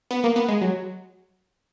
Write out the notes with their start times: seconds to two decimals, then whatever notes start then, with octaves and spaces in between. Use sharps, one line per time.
0.11 B3
0.24 A#3
0.36 B3
0.48 G#3
0.61 F#3